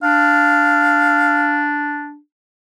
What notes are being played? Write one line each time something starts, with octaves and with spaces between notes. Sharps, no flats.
D4 F5